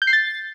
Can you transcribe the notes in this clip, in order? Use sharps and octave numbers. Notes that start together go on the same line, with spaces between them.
G6
C7
A6